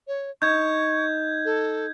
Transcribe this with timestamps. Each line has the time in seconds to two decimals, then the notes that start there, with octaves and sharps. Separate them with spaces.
0.08 C#5
0.42 D#4 C#6 G6 G#6
1.45 A4